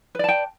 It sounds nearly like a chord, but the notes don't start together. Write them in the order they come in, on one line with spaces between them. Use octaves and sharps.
B4 D5 A5 G5